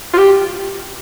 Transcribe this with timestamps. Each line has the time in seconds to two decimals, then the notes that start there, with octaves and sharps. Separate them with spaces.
0.13 F4
0.18 G4